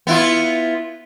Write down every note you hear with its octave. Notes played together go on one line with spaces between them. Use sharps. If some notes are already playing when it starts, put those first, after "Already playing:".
B3 E4 F4